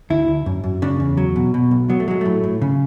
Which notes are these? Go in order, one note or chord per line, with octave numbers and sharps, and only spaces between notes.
D2 E4
D2
F#2
F#2
C#3 D4
E2
F#3
B2
B2
B1
F#3 B3
A3
F#3 G#3
A2 A3
A2
C#3